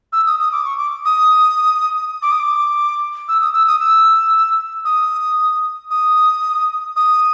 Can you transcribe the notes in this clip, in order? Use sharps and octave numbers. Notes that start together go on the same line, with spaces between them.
E6
D#6
D#6
D6
C#6
D6
D#6
D6
D#6
D6
E6
D#6
E6
D#6
E6
D#6
D#6
D#6